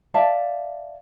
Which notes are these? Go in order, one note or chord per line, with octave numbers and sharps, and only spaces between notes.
D5 E5 F5 A5